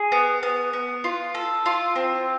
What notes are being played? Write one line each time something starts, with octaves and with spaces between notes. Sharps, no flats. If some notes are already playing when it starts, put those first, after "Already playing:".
Already playing: G#4
B3
B3
B3
F4
A4
F4
C4